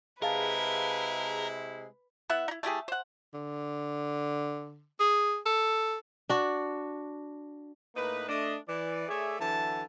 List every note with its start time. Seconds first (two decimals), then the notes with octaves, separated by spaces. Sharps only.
0.22 C3 G#3 E4 G#4 A#4 B4 F5 A5
2.30 B3 E4 E5 F#5
2.48 D#4 E4
2.63 A3 E4 G4 G#4
2.88 C5 F#5
3.34 D3
5.00 G#4
5.46 A4
6.29 D4 F#4
7.96 A2 A#3 D#4 B4
8.29 A3 D4 D#5
8.68 E3 D5
9.09 A3 G#4 C#5 D5 E5
9.40 D3 E3 F#3 E5 A5